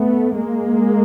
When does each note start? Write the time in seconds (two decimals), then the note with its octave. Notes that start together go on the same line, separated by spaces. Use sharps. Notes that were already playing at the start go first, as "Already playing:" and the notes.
Already playing: A3 B3
0.36 G#3 A#3